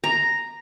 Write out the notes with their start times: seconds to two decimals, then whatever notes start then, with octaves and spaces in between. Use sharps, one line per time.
0.04 A#5